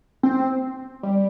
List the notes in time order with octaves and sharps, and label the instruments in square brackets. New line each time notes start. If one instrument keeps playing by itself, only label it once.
[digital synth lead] C4
G3